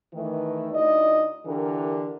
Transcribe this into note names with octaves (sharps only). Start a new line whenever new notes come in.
D#3 E3 A3
D2 D#4 E4 D5 D#5
D3 E3 G4 A#4